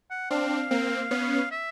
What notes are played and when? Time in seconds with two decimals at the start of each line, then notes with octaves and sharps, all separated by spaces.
0.11 F#5
0.30 C4 D4 F5
0.71 A#3 C4
1.11 B3 C#4
1.51 E5